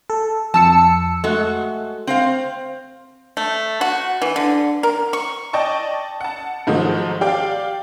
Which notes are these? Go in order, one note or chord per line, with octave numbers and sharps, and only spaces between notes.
A4
F2 A5 E6 C#7
G#3 A3 F#4
C4 C5 F5
A3
F#4
E3
D3
A#4
C#6
D5 D#5 G5 A5 C#6
F#5 A5
G#2 D#3 F3 F#3 A3
G4 D5 F5 G5